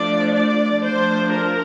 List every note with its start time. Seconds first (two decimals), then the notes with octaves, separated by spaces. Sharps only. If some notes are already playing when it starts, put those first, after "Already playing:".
Already playing: F3 A3 D4 D5
0.36 D5
0.85 F3 A3 D4 C5
1.34 A#4